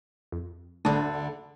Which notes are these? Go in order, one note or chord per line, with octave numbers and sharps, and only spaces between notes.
F2
G#1 D2 D3 A3 D4